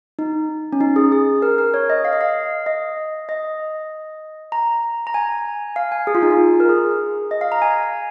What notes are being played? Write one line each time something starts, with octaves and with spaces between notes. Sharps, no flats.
D#4
C#4
D#4
G#4
G#4
A#4
A#4
C#5
D#5
F5
D#5
F5
D#5
D#5
A#5
A#5
G#5
F5
G#5
G#4
F4
D#4
F4
A#4
G#4
D#5
F5
A#5
G#5